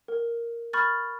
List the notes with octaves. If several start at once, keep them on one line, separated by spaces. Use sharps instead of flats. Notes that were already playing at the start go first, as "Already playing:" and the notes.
A#4
B5 C#6 F6 G6 A6